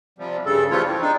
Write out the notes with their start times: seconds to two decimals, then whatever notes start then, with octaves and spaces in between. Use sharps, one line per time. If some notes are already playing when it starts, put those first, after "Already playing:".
0.19 C3 F3 G3
0.46 G2 C#3 A4
0.71 E3 F3 G3 A3 F4 C#5
0.86 C4
1.01 D4 D#4